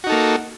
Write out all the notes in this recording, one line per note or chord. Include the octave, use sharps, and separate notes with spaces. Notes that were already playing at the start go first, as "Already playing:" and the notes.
A#3 D#4 F#4 A4